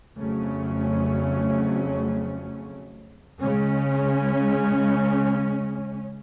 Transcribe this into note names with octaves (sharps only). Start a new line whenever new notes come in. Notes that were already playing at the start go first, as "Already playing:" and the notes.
F2 C#3 F#3 A3 C#4
C#3 G#3 C#4